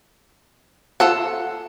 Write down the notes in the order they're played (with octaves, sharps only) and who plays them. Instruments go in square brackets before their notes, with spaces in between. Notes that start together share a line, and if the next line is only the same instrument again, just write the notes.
[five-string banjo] F4 A4 F#5